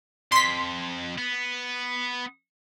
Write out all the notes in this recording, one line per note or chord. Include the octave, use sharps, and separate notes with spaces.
F2 C6 B6
B3